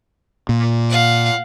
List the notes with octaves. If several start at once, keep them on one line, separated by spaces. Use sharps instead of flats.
A#2
F5 F#5